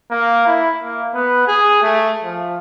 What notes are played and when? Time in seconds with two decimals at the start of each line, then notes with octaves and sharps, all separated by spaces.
0.11 A#3
0.47 E4
0.83 A#3
1.14 B3
1.47 G#4
1.82 A3
2.24 F3